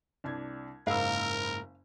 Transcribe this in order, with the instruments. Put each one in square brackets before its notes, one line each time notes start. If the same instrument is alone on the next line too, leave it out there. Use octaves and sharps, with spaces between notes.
[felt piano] C2 D4 G#6
[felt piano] F#1 B5 E6 [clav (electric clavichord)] G#2 A#3 [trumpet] A#4 [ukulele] F5